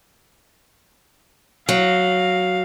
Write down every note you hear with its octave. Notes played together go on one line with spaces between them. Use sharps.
F#3 F5